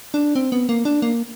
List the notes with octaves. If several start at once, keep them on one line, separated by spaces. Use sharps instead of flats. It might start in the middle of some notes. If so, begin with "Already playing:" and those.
D4
C4
B3
A#3
D4
A#3